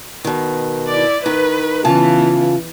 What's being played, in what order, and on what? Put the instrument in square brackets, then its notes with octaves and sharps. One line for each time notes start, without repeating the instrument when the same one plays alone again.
[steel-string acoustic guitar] B2 D#3
[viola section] E4 D5
[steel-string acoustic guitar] D#3 [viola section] B4
[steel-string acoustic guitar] C#3 F4 A5 [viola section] E3 B3